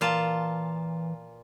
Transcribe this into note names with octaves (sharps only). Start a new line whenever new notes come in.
A#2 E3 F4 A5